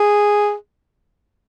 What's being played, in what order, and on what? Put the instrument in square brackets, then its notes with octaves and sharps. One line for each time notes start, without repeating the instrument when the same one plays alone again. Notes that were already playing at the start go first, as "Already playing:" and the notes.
Already playing: [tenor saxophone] G#4